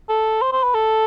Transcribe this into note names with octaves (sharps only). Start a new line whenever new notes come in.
A4
C5
C5
B4
A4